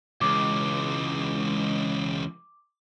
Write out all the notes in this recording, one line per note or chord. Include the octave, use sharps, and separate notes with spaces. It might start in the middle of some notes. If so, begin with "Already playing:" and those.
C#2 E3 G#3 D6